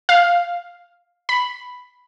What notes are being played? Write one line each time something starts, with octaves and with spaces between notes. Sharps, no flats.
F5
B5